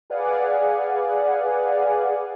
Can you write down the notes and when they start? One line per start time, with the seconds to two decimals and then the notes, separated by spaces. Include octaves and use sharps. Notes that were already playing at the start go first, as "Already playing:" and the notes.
0.10 G#4 B4 D5 F5 F#5 G#5